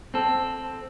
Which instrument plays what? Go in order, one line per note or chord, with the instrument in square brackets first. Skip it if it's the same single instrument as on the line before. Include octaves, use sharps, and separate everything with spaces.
[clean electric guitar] C4 A4